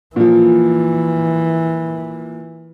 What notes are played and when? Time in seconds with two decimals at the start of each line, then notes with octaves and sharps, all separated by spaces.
0.16 A#2 E3 F3